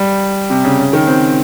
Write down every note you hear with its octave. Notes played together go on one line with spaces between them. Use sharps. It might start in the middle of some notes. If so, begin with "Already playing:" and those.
Already playing: G3
C3
C#3
C#3
D#3
C4